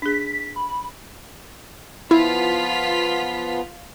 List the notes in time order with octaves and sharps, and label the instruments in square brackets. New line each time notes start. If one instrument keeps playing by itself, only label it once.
[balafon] D4 G#4 [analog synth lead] B6
[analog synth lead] B5
[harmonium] F3 B3 [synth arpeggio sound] E4 [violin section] F4 B6